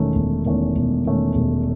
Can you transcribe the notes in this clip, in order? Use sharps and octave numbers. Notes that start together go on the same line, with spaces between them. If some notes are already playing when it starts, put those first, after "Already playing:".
Already playing: E1 E2 D#3 A3 C#4
E1
E2 D#3 A3 C#4
E1
E2 D#3 A3 C#4
E1